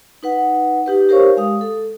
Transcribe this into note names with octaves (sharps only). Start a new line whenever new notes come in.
D#4 B4 F#5
D#4 G4 B4
G4 A#4 C5 C#5 F5 C#6
G#3 F5 D#6
A4